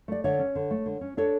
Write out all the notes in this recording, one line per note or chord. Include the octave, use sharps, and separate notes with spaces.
A3 D5
D3 C#5 E5
C#4
D3
A3
D3
C#4
D4 A4 C#5